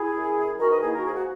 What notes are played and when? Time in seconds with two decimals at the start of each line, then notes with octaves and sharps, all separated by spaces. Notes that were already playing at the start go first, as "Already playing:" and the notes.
Already playing: E4 G#4
0.14 F#2
0.36 F#2
0.59 D#3 F#4 A#4
0.71 B4 D#5
0.82 A#3 E4 G#4
0.94 F#4 A#4
1.06 G#2 G#4
1.15 F#4